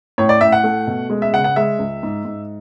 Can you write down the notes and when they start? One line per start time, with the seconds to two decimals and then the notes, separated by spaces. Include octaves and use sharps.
0.18 A2 C#5
0.29 D5
0.40 A2 E5
0.52 F#5
0.64 A3
0.87 B2
1.10 G#3
1.22 E5
1.33 C#3 F#5
1.44 F#5
1.56 G#3 E5
1.79 C#2
2.03 G#2
2.25 G#2